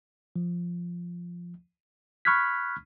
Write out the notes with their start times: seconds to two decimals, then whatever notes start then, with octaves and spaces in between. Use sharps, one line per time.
0.36 F3
2.25 B5 C#6 F6 F#6 G#6 B6